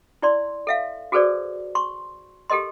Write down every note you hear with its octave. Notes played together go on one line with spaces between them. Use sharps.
E4 D5 C6
A4 E5 F5
F#4 G#4 A4 B4 C5 D5
C6 C#6
G4 A4 A#4 D#5 C6